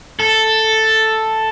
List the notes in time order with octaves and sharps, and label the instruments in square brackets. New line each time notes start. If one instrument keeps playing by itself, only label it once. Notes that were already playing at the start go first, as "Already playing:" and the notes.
[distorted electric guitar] A4